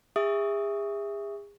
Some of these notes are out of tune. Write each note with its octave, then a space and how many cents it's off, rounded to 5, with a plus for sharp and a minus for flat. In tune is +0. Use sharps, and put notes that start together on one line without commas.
G#4 -40 E5 +0 D#6 +0